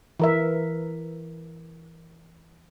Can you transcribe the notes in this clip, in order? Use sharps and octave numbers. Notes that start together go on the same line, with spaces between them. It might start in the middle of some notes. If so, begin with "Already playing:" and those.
E3 A#4 E5